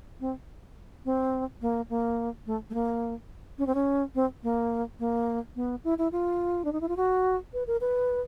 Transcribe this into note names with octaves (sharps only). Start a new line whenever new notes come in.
C4
C4
A#3
A#3
A3
A3
A#3
C#4
C4
C#4
C4
A#3
A#3
B3
E4
E4
F4
D4
D#4
E4
F4
F#4
B4
A#4
B4